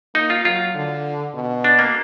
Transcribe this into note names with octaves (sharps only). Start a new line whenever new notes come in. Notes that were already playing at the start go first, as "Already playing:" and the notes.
A#3 D#4
F4
F#3 F4
D3
B2
D4
A#3